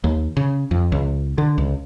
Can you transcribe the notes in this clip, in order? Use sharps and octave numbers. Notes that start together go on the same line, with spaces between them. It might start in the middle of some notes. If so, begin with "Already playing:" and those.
D#2
C#3
F2
C#2
D3
C#2